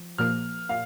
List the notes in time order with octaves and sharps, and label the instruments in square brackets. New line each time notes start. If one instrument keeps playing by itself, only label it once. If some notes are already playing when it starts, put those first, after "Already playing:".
Already playing: [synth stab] F3
[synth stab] A#2 F3 A#3 [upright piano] F6
[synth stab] A#2 [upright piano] F5